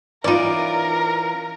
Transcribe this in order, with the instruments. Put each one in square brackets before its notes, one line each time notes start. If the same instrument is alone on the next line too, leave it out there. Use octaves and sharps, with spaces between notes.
[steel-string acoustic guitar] E3 C#4 F4 [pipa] D#4 D5 [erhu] A#4